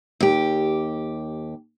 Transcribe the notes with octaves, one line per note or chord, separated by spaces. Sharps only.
D#2 G4